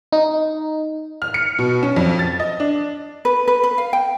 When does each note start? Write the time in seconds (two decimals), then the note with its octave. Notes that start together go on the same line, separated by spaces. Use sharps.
0.12 D#4
1.22 F6
1.34 C#7
1.58 B2
1.83 C#4
1.96 F2
2.19 A6
2.40 D#5
2.60 D4
3.25 B4
3.48 B4
3.64 B4
3.78 F5
3.93 G5